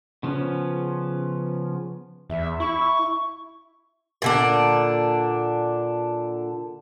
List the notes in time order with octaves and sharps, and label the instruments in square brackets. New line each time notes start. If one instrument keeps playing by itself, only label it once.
[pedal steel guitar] C#3 F3 B3 C#4
[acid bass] E2 [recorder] E5
[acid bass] E4 [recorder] C#6
[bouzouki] A#2 D3 D4